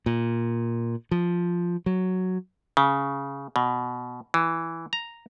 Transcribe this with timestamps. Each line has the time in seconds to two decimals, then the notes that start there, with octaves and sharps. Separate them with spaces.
0.06 A#2
1.11 F3
1.86 F#3
2.77 C#3
3.56 B2
4.34 E3
4.93 A#5